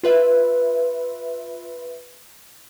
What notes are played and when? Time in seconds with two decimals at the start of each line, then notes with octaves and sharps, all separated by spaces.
0.03 F4 B4 E5